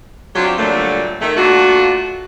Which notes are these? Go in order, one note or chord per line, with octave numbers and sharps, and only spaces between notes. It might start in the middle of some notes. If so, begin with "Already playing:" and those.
F#3 C4 D4 F4 G4
G2 A#2 D3 F#3 A3 A#3
D#3 A3
A3 A#3 D4 F4 F#4